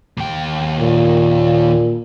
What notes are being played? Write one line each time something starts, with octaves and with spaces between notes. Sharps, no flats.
D#2 G5
A#2